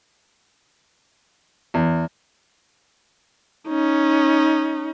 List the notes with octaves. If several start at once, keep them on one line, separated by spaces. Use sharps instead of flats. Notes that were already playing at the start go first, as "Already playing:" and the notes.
E2
C#4 D#4